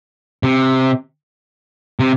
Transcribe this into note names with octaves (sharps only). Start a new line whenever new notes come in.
C3
C3